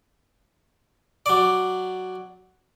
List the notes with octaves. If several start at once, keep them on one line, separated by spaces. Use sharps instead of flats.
F#3 D5